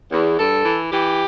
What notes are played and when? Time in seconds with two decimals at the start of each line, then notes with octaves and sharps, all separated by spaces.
0.11 E2
0.38 G2 A4
0.65 E3
0.91 E3 G4